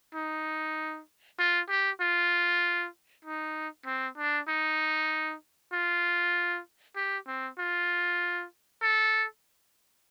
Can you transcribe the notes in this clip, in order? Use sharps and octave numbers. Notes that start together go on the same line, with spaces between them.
D#4
F4
G4
F4
D#4
C4
D4
D#4
F4
G4
C4
F4
A4